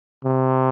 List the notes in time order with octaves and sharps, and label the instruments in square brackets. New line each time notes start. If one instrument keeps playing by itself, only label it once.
[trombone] C3